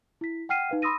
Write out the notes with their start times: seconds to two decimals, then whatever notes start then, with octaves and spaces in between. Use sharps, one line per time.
0.21 E4 B6
0.49 F#5 G5 F6 C7 D#7
0.69 D#4 B4 F5
0.82 B5 C6 D#6 E6 A#6 D#7